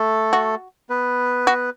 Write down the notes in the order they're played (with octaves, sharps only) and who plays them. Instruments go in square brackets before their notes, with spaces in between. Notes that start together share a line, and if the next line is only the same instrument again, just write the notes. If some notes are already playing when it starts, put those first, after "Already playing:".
Already playing: [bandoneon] A3 A4
[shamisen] F#4
[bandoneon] B3 B4
[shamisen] F#4